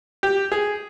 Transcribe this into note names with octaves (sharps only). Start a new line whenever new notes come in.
G4
G#4